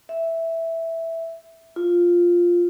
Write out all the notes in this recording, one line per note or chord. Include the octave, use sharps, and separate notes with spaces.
E5
F4